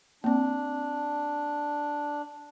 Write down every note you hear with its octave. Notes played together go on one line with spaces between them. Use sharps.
A#3 C4 D4